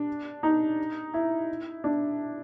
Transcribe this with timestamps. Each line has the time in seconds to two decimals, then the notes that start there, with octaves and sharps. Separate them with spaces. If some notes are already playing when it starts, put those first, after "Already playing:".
Already playing: D4
0.43 D#4
1.14 E4
1.84 D4